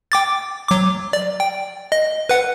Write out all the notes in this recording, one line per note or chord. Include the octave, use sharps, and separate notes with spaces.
G5 D6 A6
F#3 D6
D5
G5
D#5
B4 F#5